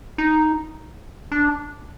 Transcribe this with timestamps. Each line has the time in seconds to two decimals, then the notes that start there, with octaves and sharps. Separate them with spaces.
0.18 D#4
1.32 D4